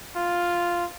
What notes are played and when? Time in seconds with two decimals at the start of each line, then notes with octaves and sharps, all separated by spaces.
0.16 F4